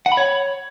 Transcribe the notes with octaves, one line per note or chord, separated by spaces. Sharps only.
F#5
B5
C#5